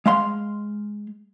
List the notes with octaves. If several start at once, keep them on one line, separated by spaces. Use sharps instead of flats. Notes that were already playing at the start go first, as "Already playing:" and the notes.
G#3 F5 C6